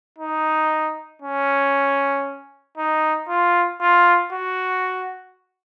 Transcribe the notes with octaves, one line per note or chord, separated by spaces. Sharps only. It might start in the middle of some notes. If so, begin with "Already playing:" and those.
D#4
C#4
D#4
F4
F4
F#4